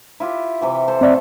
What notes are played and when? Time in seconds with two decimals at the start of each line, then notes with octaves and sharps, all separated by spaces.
0.20 E4 F4 G4
0.61 C3 E3 G5
0.88 A4 C5 C6
1.01 A3 B3 C4 D5 E5